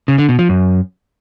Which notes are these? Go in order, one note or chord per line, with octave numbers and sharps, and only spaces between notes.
C#3
D3
B2
F3
F#2